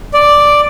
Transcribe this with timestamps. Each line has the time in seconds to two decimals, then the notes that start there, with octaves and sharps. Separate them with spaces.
0.13 D5